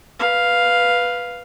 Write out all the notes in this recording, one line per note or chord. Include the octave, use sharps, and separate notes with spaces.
B4 F5